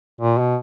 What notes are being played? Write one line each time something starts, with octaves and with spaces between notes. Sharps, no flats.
A#2
B2